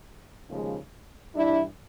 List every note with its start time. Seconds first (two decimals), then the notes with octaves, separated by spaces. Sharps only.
0.47 D#2 C#3 F3 G#3
1.35 G2 E3 G3 D4 E4